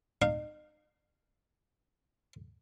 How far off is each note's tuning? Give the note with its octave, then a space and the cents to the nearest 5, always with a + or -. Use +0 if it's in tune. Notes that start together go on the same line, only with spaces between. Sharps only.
D#4 -40 F5 +0